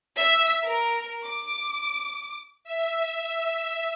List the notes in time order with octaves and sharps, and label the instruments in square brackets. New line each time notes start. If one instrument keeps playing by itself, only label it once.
[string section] E5
A#4
D6
[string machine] E5